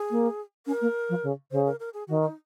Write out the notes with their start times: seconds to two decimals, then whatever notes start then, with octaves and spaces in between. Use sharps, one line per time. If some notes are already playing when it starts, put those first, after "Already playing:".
Already playing: G#4
0.11 A#3
0.67 C#4 A#4
0.81 A#3
1.09 F3
1.23 C#3
1.51 C#3 C5
1.66 A#4
1.80 A#4
1.94 G#4
2.08 D#3 F#4
2.22 D#4